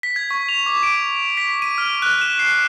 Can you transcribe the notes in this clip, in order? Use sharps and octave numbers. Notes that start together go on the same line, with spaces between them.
B6
G#6
C#6
F7
D6
D7
B6
D#7
F6
F#6
E7
C7